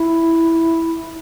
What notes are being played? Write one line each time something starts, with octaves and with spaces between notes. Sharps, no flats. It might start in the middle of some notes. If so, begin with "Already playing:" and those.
Already playing: E4